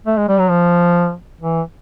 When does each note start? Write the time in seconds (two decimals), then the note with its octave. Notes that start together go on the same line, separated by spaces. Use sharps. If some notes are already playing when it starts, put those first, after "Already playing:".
0.07 A3
0.17 G#3
0.29 G3
0.39 F#3
0.50 F3
1.40 E3